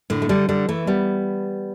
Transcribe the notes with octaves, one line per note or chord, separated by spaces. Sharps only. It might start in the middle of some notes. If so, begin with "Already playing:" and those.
A2 D3
A3
D3 G3
D3 G3
E3 A3
G3 B3